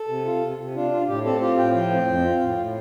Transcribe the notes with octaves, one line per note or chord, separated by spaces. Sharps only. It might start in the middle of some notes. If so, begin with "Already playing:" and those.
Already playing: A4
C3
F4
C3
C3
D4 F4
F4
A2 G4
C4 A4
F4 G4
A2 G5
F3 G5
C4
F2
F4
A2
A2